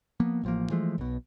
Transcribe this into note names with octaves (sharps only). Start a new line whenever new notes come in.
F3 A#3 B3
A1 F3 A#3
E3 F3 G#3 A3
B1 B2